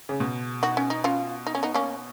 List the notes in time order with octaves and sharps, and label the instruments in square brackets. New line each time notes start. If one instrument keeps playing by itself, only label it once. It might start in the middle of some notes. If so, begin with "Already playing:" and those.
[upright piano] C#3
B2
[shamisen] D#4 F#4
C#4
D#4
C#4 F4
D#4
C#4
B3 D#4
A#3 C#4